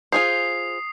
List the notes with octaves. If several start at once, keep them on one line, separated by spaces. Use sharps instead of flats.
F4 G#4 C5 D#6 C7